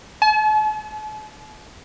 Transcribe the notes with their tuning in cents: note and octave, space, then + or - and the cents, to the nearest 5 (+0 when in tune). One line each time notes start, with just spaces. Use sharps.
A5 -45